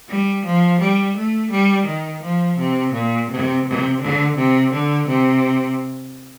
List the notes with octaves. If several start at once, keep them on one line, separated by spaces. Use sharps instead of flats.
G3
F3
G3
A3
G3
D#3
F3
C3
A#2
C3
C3
D3
C3
D3
C3